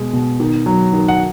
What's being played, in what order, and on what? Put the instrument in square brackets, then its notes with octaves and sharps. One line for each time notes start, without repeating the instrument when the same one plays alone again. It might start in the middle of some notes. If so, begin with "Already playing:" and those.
Already playing: [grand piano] B2 G#3
B2
D#3
F#3
D#3
F#5